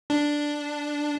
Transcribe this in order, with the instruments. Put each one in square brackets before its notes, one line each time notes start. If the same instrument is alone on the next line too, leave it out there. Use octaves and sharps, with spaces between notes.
[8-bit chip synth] D4